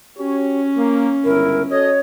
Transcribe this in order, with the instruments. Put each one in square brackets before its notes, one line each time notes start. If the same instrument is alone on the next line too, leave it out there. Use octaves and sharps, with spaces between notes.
[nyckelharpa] C#4 [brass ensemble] F#4 G4 C#5
[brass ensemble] A#3
[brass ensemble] G1 C#2 E4 [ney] A#4
[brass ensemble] F#4 A4 D#5 [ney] C#5